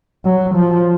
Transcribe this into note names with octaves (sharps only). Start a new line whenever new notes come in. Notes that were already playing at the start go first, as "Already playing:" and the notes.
F#3
F3